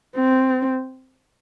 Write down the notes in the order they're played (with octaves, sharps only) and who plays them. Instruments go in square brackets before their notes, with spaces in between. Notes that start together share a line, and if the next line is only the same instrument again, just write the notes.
[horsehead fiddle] C4